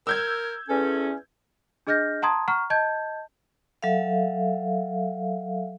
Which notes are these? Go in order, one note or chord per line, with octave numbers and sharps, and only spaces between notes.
A#4 E6 G6 G#6
E2 C#4 A4
D4 G#4 D#5 F6 G6 A#6
F#5 A5 A#5 C6 D#6 G#6
F#5 A#5 C#6 F6
D#5 A5 G6 G#6
F#3 A4 E5 F5